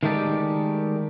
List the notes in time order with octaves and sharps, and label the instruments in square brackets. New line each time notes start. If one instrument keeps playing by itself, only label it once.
[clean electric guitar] D#3 G#3 A3 D#4 G4 D5